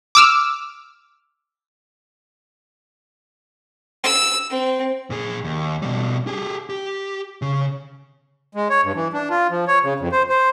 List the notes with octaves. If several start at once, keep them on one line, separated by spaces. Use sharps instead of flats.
D6 E6 F6
E6
C4
A#2 G#4
D#2
B2 G3
G4 G#4
G4
C#3
G#3
C#5
G2
E3
D4
F4
F3
C#5
C#3
F2
C5
C5